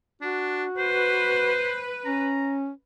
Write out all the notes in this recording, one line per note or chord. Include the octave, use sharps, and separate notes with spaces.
D4 F#4
B4 C5
C#4 A#5